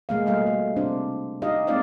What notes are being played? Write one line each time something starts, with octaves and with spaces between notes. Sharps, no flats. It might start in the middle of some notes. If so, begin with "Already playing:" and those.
B2 G#3 A#3 F5
G3 A3 F5
A3
C3 D4 C5
D#4 G4 D#5 F5
G#3 A#3 C4 D#4 D5 F5